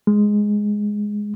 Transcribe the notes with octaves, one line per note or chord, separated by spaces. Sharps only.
G#3